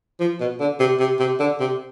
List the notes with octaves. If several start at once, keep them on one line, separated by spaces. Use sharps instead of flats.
F3
B2
D3
C3
C3
C3
D3
C3